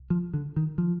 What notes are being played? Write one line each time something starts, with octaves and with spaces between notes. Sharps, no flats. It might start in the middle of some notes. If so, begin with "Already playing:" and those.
Already playing: C2
F3
D3
D#3
F3